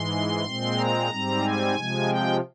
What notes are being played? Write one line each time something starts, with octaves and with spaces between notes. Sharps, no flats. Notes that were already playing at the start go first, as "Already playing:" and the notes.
Already playing: G#2 E3 G#3 C6
A#2 G#3 C4
A#5
G#2 G3 C4
G#5
C3 F3 G#3
G5